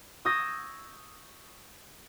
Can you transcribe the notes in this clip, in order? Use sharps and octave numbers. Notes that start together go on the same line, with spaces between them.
C#6 D#6 E6 G6 G#6 A#6